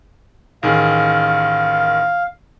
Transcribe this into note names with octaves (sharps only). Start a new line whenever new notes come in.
A1 D#3 G#4 F5